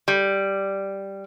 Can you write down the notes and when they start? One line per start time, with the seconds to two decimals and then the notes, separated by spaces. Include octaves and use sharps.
0.08 G3